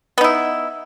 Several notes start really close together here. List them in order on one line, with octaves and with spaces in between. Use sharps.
B3 D#4 E4